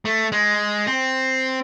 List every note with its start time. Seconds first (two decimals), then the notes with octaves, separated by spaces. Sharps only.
0.05 A3
0.32 G#3
0.87 C4